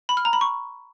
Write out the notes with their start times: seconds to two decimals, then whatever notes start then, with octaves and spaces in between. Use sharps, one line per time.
0.09 B5
0.17 F6
0.25 A#5
0.33 B5
0.41 C#6